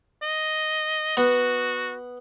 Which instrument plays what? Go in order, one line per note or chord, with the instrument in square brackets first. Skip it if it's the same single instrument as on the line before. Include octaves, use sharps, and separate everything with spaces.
[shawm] D#5
[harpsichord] B3 [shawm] F#4